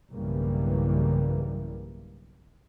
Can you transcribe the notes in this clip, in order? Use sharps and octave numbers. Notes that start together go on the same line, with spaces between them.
B1 G2 C#3 E3 G3 A#3